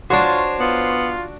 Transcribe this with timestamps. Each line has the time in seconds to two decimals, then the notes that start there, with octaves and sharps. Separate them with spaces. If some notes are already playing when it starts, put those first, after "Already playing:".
0.10 D4 F4 F#4 C5 C#5
0.60 B3 F4